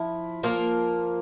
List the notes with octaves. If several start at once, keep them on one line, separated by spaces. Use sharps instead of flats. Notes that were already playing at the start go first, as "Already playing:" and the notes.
Already playing: F3 E4
F3 A#3 F4 A#4